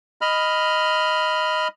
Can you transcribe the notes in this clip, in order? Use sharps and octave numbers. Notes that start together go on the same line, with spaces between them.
D#5 B5 F6